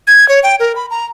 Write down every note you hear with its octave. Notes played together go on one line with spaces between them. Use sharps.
G#6
C#5
G5
A#4
B5
A#5